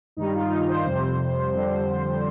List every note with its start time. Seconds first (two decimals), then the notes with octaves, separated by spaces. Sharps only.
0.17 G2 D#3 G3 D#4
0.34 F4
0.51 D#4
0.68 C5
0.85 F2 C3 G3
1.54 F2 D3 G3